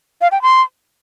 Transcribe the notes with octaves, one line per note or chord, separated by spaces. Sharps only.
F5
G5
C6